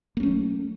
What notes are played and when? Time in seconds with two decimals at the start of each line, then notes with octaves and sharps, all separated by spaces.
0.17 A#3
0.20 C#4
0.23 A3
0.26 F#3